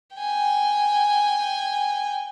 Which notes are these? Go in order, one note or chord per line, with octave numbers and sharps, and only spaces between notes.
G5 G#5